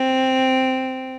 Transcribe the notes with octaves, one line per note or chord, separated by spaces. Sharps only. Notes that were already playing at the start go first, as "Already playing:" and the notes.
Already playing: C4